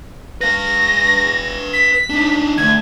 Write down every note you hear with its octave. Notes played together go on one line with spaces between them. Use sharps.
B4 F5 A#6
B6
D4 D#4
D3 A3 G#6